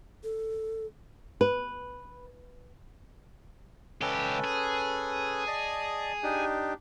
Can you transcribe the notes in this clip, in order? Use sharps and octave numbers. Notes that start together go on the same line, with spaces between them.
A4
B4
C#2 C#4 G4 A4 B4
G#4
D5 D#5 A5
D4 D#4 G4